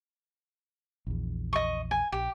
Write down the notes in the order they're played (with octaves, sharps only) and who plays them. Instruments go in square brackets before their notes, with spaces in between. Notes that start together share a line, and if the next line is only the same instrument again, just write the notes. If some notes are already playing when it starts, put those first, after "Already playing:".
[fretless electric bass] A#1 E2
[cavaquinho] D#5 C#6
G#5
[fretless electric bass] A#1 [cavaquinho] G4